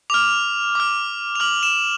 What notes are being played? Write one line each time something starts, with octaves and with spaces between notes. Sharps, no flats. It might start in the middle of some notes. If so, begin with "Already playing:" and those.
D6 F6 F7
D6 F6
F7
D6 F6 F#7
E7